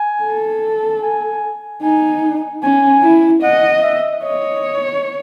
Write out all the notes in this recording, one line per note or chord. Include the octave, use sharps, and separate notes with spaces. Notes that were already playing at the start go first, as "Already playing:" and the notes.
Already playing: G#5
A4
G#5
D#4 G#5
C#4 G#5
E4
D#5 F#5
E5
C#5 D#5